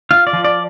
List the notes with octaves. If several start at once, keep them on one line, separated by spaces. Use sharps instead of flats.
F4 F5
D5
F3
D5